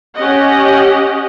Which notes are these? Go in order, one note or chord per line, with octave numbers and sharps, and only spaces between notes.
C#4 G4 D#5 F#5